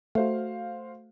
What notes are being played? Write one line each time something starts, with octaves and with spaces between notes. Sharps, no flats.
A3 F#4 C5 F5